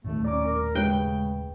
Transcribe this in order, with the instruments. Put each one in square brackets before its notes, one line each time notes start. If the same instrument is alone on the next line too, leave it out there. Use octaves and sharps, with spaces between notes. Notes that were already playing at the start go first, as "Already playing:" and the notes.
[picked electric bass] D#1 D#2 A2 [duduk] A3
[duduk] C#4 [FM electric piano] D5 A#5 D6
[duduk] A#4
[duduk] C#3 [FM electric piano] G#3 B4 [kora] G5